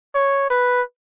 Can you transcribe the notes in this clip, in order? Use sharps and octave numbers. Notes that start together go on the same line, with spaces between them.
C#5
B4